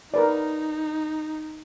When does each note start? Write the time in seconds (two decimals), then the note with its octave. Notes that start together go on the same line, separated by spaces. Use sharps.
0.14 D#4 A#4 B4 D5